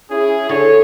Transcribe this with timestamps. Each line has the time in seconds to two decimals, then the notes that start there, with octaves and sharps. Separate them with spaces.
0.11 C#4 E4 G#4
0.49 D3 E4 C#5